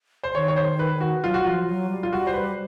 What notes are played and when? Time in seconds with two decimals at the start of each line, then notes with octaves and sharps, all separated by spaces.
0.24 C5
0.34 D#3 C#5
0.48 C#5
0.56 C5
0.79 B4
1.01 F#4
1.23 F#3 F4
1.34 F#4
1.44 F3 F4
1.67 F#3
1.89 G3
2.03 F4
2.12 G3 F#4
2.27 C5
2.34 B4